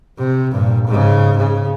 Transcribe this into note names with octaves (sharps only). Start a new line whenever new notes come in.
C3
G2 A#2
G#2 C#3
C#3